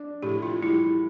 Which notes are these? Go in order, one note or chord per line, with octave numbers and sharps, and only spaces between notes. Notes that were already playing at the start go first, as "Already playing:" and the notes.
Already playing: D4
A2 G4
F4
G3 E4